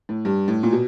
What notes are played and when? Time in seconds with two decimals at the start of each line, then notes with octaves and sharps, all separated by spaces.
0.09 A2
0.25 G2
0.48 A2
0.63 A#2
0.73 B2